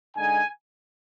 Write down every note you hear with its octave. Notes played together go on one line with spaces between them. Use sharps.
D3 G#3 D#4 G#5